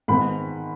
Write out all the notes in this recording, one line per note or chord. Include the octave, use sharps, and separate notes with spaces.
G#2 D#3 B3 B5